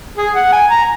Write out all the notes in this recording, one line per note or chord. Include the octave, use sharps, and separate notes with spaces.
G#4
F#5
G#5
A#5